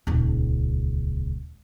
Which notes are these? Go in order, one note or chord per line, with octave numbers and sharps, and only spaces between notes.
D#1 C#2